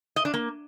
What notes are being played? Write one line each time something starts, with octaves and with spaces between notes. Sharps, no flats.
D#5
D4
A#3